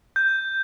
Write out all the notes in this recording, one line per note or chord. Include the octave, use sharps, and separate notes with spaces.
G6